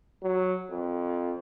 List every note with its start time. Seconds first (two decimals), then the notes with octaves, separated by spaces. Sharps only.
0.22 F#3
0.71 F2